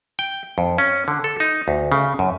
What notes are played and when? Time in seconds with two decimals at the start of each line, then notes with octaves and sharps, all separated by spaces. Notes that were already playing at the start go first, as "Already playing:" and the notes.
0.19 G5
0.58 F2
0.78 C#4
1.08 D3
1.24 A4
1.40 D#4
1.68 D2
1.92 C#3
2.19 F#2